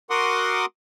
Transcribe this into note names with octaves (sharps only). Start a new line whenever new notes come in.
F#4 A#4 F#5 C6 D6 D#6